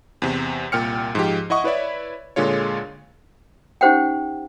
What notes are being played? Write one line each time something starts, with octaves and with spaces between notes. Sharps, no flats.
E2 C3
C2 A#2 G5 F6 C#7
G#2 F3 G4
E4 D#5 F#5 C#6 D#6
E4 B4 C#5 D5 E5
A#2 D3 G#3 F4 C#5
C#4 D#4 G4 C5 F#5 G5